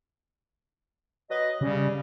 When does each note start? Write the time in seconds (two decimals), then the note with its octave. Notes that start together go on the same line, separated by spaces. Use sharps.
1.30 F#3 B4 D#5
1.61 C#3 G3